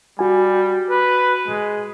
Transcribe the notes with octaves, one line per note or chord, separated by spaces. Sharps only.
G3 F#4 G#5
B4
G#3